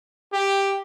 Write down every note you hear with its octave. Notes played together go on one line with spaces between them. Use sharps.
G4